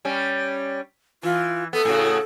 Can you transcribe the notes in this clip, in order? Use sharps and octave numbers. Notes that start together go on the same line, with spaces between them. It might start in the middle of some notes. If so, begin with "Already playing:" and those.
G3 C#4
E3 F4
B3 A4
A2 C#3 F#4